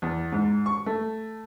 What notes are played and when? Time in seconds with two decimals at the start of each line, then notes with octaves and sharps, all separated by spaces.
0.02 E2
0.32 G#2
0.66 C#6
0.86 A3